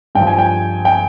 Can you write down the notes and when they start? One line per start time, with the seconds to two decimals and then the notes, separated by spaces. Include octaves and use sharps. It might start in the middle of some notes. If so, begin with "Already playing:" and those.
0.15 G2 F3 G5
0.27 G#5
0.39 G5
0.85 G5